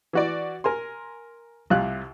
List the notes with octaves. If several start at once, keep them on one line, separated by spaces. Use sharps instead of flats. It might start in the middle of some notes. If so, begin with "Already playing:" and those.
E3 F#4 D5
A#4 G#5 C6
C2 C3 F4 F5 F#6